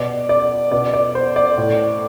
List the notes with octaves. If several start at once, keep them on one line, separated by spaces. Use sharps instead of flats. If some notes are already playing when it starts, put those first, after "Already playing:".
Already playing: B2 D5
D5
B2 D5
D5
C5
D5
A2